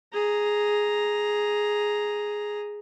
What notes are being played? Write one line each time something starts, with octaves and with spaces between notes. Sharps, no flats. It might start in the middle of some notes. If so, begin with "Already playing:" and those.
G#4 A#5